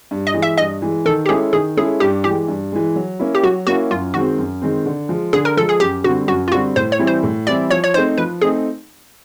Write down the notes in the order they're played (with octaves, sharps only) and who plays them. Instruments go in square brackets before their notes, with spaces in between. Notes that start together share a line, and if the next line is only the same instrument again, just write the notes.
[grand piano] G2
[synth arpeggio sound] D#5
[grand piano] E3 G#3
[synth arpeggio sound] E5
[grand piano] G2 [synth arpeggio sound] D#5
[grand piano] E3 G#3
[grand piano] D#3 [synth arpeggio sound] A4
[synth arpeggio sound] G4
[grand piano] G#3 C#4 E4 A4 [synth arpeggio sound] G#4
[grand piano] D#3 [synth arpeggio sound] G#4
[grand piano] G#3 C#4 E4 A4 [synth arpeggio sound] G#4
[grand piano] G2 [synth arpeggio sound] G4
[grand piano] E3 G#3 [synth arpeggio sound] G4
[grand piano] G2
E3 G#3
F#3
A#3 C#4 E4
[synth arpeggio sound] G4
[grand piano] F#3 [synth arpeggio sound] F#4
[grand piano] A#3 C#4 E4 [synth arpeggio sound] F#4
[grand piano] F#2 [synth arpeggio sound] F4
[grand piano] D#3 G#3 C4 [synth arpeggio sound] F#4
[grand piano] F#2
D#3 G#3 C4
D3
F3 G#3
[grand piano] D3 [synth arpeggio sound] G#4
[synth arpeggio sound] A#4
[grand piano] F3 G#3 [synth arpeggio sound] A4
[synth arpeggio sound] G#4
[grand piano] F#2 [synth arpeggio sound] G4
[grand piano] D3 G3 C4 [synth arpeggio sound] F#4
[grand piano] F#2 [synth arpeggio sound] F#4
[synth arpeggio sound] F4
[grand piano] D3 G3 C4 [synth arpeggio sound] F#4
[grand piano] A2 [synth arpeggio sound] C5
[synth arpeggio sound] C#5
[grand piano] E3 G3 C4 E4
[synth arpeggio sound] C5
[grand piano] A2
[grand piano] E3 G3 C4 E4 [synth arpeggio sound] D5
[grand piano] F3 [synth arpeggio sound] C#5
[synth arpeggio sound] C#5
[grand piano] A3 C4 D#4 [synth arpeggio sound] C5
[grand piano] F3 [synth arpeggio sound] B4
[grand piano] A3 C4 D#4 [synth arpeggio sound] G#4